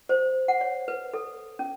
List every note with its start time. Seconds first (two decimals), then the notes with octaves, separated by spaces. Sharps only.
0.09 C5
0.48 F#5
0.61 C#5
0.88 B4
1.14 A4
1.59 C#4